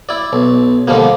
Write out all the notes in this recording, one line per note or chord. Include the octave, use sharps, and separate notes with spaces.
E4 D5
B1
D3 D#3 F3 G3 A#3